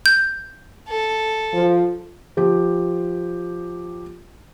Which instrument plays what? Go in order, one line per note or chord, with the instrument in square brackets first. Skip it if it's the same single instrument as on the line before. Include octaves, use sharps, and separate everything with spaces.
[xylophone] G6
[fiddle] A4
[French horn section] F3
[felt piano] F3 G4